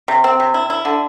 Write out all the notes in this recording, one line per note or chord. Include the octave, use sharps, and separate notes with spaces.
C3
C4
C3
E4
E4
D3